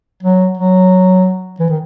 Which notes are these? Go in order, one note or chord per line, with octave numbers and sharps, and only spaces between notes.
F#3
F#3
E3
D#3